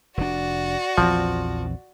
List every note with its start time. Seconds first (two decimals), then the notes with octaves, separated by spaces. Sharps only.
0.17 F1 D4 F#4 D5
0.98 A#1 E2 F3 C4